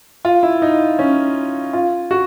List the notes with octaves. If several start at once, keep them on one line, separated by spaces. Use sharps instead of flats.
F4
E4
D#4
C#4
F4
F#4